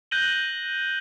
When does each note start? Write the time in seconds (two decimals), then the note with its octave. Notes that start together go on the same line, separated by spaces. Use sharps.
0.11 F#6 G6 A#6 D#7 F#7 G7